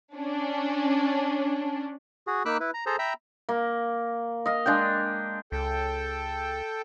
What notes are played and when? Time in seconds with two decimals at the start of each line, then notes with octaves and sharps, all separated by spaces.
0.16 C#4 D4
2.27 F#4 G#4
2.46 A#3 D#4 B5 D6 E6 F#6
2.60 E4 B4
2.74 A#5
2.86 G#4 A4 C5 A#5
2.99 E5 G5 A#5 B5 E6
3.49 A#3
4.46 D#5 F5
4.66 G#3 D4 F5 G5
5.52 C#2 A4 G5